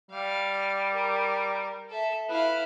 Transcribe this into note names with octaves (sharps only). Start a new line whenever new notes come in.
G3 F5
A#4
A4 E5
E4 B4 F5